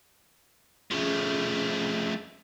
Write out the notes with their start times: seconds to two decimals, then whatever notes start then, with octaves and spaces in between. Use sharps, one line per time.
0.91 F3 A3 C#4 G#4